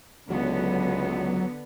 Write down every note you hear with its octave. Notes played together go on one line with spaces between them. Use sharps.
C#2 D3 F#3 B3